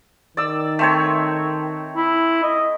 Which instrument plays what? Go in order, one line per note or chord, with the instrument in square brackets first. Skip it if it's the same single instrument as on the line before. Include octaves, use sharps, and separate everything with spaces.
[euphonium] D#3 [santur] D5 E6
[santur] A3 C4 C#5
[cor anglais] E4
D#5